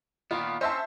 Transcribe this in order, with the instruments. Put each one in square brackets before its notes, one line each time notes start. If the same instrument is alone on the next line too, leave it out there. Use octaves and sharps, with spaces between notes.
[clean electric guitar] A#2 D#3 B3 [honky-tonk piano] F4
[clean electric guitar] C4 C#4 [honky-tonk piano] C5 E5 A5